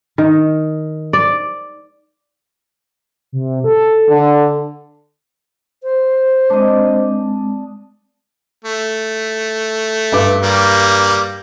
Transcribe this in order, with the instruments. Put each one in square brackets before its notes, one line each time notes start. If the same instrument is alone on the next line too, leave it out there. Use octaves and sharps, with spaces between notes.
[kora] D#3
D5
[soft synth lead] C3
A4
[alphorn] D3
[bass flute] C5
[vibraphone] G#3 C4 [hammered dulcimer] D4 D#5
[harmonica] A3
[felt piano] G2 D6
[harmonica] G3 A#3